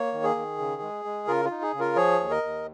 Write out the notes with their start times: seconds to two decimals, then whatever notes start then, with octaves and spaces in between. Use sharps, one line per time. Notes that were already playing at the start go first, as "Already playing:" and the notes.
Already playing: A#3 C#5
0.13 D#3
0.24 G#4
0.35 D#3
0.58 C#3
0.82 G#3
1.05 G#3
1.27 C#3 F4 A#4
1.45 F4
1.51 D#4
1.62 G#4
1.74 C#3
1.79 F4 A#4
1.96 F3 G#4 C#5
2.20 D#2
2.30 A#4 D#5
2.43 D#2